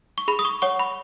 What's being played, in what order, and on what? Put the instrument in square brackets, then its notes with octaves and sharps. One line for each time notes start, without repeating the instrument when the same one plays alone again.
[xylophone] C#6
G#4 B5
D#6
C#6
C#5 F#5 C#6
B5